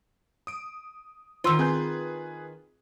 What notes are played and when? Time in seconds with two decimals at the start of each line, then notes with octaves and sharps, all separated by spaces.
0.47 D#6 D7
1.44 D#3 F4 C5 C6 E6
1.59 C4 G#4 B4 G#5 G6